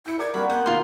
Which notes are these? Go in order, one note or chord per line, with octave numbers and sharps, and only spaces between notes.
E4 G6 C#7
A#4 D5 D6 G#6
G3 A#3 C4 D4 F#4 A#4 B5
B3 C4 F#5 G6
B2 D#3 A#3 F4 C6 F6